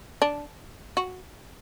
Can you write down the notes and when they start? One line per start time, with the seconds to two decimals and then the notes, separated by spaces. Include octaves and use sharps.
0.22 D4
0.97 F#4